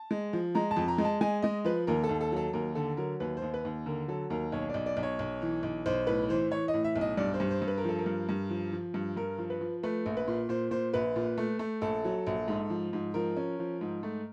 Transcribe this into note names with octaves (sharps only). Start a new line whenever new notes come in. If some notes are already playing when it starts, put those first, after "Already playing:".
Already playing: A5
G#3
F3
G#3 A#5
A5
F2
A#5
G#3
A5
G#3 G#5
G#3 D#5
F3 B4
D#2 A#4
A4
D#2
A4
F#3 A4
D#2 A#4
D3 A4
F#3 A#4
D#2 B4
C5
D#2
B4
D#2
D3 A#4
F#3 A4
D#2 A#4
B1 C#5
B1 D5
D5
B1
C#5
B1
E3
B1
B1 C5
A2 B4
E3 C5
E3 C#5
D#5
A2
E5
B1
D#5
G2 D5
C5
G2
C5
G2
B4
A#4
F3 A4
A#4
G2
G2
F3
F3
G2
G2 A#4
F3
B4
F3
A3 B4
A#1
B4
A#2
A#2 C5
A#2 C5
A#1 B4
A#2
A3
A3
A#1 A4
F#3
A#1
G#2
F3
G#2
F3 A#4
C#4
F3
G#2
A3